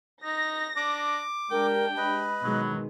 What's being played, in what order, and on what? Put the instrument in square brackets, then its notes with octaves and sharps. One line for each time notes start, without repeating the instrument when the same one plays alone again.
[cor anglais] D#4 [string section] A#6
[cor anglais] D4 [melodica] D6
[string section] G#3 D4 G4 [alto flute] A#4 [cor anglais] G5
[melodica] B4 D#5 [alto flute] B5
[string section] B2 D#3 G#3 [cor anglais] F#3